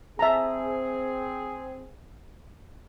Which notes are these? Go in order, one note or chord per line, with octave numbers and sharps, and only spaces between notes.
C4 G#4 E5 A5 A#5